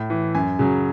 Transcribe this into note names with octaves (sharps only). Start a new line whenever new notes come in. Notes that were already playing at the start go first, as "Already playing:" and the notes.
Already playing: A2
E3
F#2 G#5
C#3 F#3